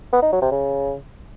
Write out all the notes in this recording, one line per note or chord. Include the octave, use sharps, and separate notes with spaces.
B3
D#4
F#3
C3
C#3